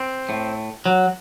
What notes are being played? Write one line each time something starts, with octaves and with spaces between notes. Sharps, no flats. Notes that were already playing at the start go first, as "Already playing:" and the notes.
Already playing: C4
A2
F#3